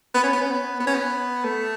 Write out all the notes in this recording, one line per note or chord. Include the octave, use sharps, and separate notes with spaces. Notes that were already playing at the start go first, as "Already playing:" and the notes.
B3
C#4
B3
C#4
B3
B3
C#4
B3
A3